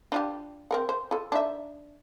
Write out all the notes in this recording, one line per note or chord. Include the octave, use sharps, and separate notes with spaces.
D4 F4 G4
C4 A#4 F#5
C5
F4 A4
D4 D#4 E5